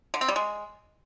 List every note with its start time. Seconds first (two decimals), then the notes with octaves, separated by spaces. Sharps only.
0.14 D3
0.21 C4
0.28 G3
0.36 G#3